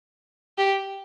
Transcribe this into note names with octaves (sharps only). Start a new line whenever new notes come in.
G4